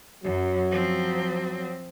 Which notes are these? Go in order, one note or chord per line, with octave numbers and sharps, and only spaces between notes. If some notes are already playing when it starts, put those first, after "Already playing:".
F#2 F#3
F3 C4